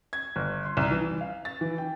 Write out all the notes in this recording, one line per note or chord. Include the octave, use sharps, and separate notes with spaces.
G#6
G1
C6
C2
E3
F5
A6
E3
G5